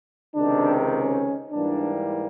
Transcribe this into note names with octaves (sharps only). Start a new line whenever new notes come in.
C#2 C3 D#3 D4
C#4
G#2 E3 G3 A#3 D4